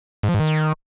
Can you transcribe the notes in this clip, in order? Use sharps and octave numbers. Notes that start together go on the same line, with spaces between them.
G#2
F3
G#2
D#3